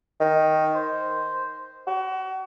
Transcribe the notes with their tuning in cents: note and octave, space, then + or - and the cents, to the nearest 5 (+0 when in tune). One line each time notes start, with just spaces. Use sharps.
D#3 +5
C5 -5
F#4 +30